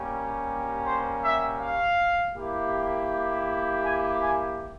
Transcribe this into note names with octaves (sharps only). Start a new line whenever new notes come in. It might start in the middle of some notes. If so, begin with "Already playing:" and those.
Already playing: G3 A#3 C#4 G4
C5
E5
F5
A#3 E4 G4
G#5
G#5